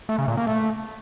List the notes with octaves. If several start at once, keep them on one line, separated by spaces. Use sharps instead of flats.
A3
C#3
A#2
A#3
A3